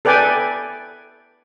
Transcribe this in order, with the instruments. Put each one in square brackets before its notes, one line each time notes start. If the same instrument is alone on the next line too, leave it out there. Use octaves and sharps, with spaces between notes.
[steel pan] A4 B4 D5 G5 G#5